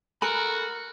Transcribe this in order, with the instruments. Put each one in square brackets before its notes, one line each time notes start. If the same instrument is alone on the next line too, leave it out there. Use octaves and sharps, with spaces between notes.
[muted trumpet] F#4 [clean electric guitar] A4 G#5 B5 [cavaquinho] A#4